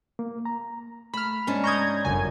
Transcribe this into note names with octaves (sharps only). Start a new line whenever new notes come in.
A#3
A#5
A3 B5 F6
G#2 C#4 D4
A#5 C#6 D#6 G6 G#6
G1 F#2 C#3 G#5